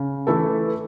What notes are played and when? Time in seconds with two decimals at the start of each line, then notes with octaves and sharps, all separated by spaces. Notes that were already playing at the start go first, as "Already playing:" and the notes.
Already playing: C#3
0.27 E3 A3 E4 A4